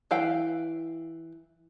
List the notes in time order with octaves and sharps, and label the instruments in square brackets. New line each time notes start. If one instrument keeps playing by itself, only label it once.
[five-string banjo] E3 F5 G5